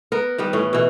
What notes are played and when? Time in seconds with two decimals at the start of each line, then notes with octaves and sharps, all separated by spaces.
0.12 B3 A#4
0.38 D#3 G3 B3
0.53 A2 E3 C#4
0.73 B2 E3